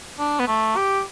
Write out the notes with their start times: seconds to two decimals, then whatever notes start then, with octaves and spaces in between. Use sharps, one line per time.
0.19 D4
0.40 B3
0.48 A3
0.76 G4